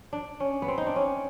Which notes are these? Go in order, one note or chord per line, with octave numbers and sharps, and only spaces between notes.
D4
C#4
B3
C4
D#4
D4
C#4